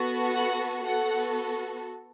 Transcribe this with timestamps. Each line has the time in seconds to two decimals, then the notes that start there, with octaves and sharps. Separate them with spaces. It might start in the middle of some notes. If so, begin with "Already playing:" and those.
Already playing: B3 F#4 A4
0.35 F#5
0.84 B3 F#4 A4 F#5